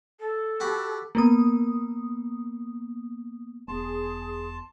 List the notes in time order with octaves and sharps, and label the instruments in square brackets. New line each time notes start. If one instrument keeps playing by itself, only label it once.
[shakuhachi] A4
[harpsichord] F#4 G4 B5
[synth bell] A#3 B3 D#6
[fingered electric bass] E1 B3 [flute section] G#4 [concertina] A5 [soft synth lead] C6